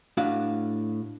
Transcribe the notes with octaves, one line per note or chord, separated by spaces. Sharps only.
A2 D4 F#4 F5